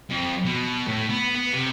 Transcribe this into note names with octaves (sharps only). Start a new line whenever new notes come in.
F2
B2
A2
B3
B3
C3